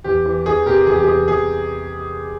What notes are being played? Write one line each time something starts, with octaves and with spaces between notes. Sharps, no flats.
E2 G4
E3
E2 G#4
C3 G4 A#4
E2 G#4
G4
E2 G#4
E2 G#4